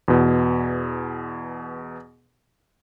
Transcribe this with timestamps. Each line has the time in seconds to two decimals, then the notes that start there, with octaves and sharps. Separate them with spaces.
0.08 E2 B2